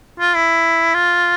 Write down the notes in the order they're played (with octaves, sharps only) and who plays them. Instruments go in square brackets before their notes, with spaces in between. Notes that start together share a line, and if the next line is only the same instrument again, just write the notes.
[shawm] F4
E4
F4